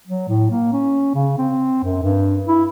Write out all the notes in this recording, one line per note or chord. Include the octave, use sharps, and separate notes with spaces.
F#3
A2
A#3
C#4
C#3
C4
F#2
G2
E4